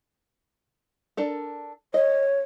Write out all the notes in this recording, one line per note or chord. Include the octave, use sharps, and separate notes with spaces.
D4 A4 A#4
C#5 D#5